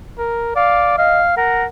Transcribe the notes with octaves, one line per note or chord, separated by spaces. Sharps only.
A#4
D5 F5
D#5 F5
A#4 F#5